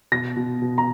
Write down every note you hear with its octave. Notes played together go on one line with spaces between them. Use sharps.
B2 A#6
B2
B2
A#5